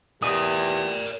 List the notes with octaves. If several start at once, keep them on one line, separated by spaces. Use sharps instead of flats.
E2 G4 A#4 D5 D#6